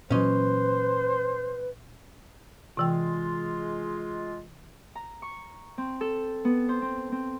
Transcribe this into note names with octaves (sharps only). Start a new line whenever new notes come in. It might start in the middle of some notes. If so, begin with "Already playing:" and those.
A#2 E3 F#3 C#4 B4 C5 D#5
C3 E3 G#3 F4 G5
A#5
C#6
C4
A4
B3
C5
C4
C4